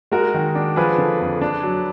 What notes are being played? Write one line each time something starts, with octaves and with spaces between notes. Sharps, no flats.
G#3 F#4 A#4
D#3
D4
F3 G#4 B4
D3
F2
D4
F#3